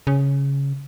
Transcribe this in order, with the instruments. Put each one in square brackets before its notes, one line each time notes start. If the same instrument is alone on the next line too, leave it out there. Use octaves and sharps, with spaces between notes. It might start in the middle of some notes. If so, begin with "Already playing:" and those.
[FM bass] C#3